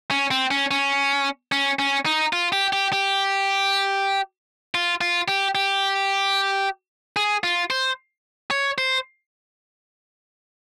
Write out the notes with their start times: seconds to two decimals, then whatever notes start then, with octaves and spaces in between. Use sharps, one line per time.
0.11 C#4
0.31 C4
0.51 C#4
0.71 C#4
1.52 C#4
1.79 C#4
2.06 D#4
2.33 F4
2.52 G4
2.73 G4
2.93 G4
4.75 F4
5.01 F4
5.28 G4
5.55 G4
7.16 G#4
7.44 F4
7.70 C5
8.51 C#5
8.78 C5